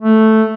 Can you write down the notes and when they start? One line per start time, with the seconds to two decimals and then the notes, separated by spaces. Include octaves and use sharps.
0.02 A3